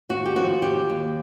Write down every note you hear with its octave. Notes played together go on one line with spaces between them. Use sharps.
D#2 F#4
G4
F3 F#4
D#2 G4
D#2